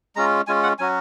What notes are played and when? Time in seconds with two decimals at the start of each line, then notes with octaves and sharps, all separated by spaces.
0.16 G#3 C#4 F4 A#5
0.47 G#3 C#4 F4 G#5
0.63 F#5
0.79 F#3 C#4 F#4 G#5